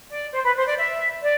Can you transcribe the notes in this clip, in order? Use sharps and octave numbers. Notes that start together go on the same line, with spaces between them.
D5
C5
B4
C5
D5
E5
D5